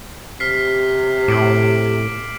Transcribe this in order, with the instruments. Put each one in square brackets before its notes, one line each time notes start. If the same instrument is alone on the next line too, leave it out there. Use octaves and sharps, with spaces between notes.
[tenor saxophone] C3 [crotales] F6 B6 C7
[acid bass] A2 [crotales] D6 D7 F#7